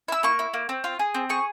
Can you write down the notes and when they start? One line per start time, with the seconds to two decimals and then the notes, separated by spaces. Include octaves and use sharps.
0.08 E4 E6
0.23 A#3 C#6
0.39 E4
0.54 A#3
0.69 C4
0.84 F4
0.99 G#4
1.14 C4
1.29 G#4 C#6